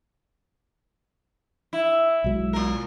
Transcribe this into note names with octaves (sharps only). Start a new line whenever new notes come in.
E4
B1 F#3 G#3
A#2 A#4